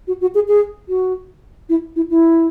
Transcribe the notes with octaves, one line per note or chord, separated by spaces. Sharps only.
F#4
F#4
G#4
G#4
F#4
E4
E4
E4